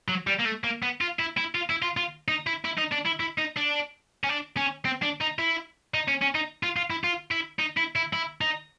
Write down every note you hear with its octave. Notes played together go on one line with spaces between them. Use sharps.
F#3
G3
A#3
A3
A#3
B3
F4
E4
E4
F4
E4
F4
F4
D#4
E4
E4
D#4
D4
E4
E4
D#4
D4
C#4
D4
C#4
C4
D4
D#4
E4
D#4
C#4
C#4
D#4
F4
F4
E4
F4
E4
D#4
E4
E4
E4
D#4